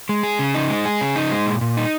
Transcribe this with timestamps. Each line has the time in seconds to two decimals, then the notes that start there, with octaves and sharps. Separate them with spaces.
0.09 G#3
0.23 G#4
0.39 C#3
0.54 D#4
0.70 G#3
0.85 G#4
1.01 C#3
1.16 D#4
1.31 G#3
1.46 A#2
1.61 A#2
1.77 D#4